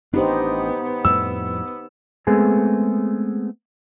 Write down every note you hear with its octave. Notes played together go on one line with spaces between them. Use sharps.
A1 B3 D4 D#4 G4 C5
F2 A2 G3 E6
G#3 A3 B3 C4 G#4